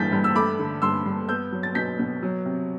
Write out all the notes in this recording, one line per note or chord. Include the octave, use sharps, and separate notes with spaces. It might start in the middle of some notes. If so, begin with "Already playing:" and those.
Already playing: G2 E3 A3 G6 A6 B6
G2
E6
A3 B5 D6
D3
G2 C6 E6
G2
B3 E6 G6
F#3
A6
B2 G6 B6
B2
F#3
C3